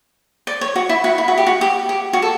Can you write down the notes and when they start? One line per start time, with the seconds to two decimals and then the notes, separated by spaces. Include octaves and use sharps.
0.47 D5
0.61 C#5
0.76 F#4
0.89 E4
1.04 F#4
1.18 E4
1.28 F#4
1.38 G4
1.47 F#4
1.61 G4
1.89 G4
2.13 F#4
2.22 A4